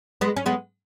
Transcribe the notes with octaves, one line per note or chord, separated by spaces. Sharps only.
G#3 B3
C#4
G#3 B3